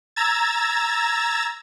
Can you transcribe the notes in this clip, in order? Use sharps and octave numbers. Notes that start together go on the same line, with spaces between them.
A#5 E6 G#6 A6